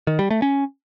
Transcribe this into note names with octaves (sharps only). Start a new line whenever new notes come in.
D#3
G3
A3
C#4